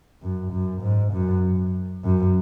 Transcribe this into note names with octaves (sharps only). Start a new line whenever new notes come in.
F#2
F#2
G#2
F#2
F#2